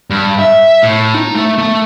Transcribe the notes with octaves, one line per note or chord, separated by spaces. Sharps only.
G2
E5
A2
D#4
A3
A3